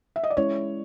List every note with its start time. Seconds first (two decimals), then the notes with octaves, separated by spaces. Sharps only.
0.16 E5
0.24 D#5
0.30 D5
0.37 G#3 C#4 E4 C#5